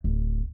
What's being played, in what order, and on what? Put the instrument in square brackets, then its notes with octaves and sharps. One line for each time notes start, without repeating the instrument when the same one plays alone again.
[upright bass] D1